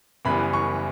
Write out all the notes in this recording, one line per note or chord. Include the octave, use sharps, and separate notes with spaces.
F#1 F#2 E3 G3 B3 B5
C#6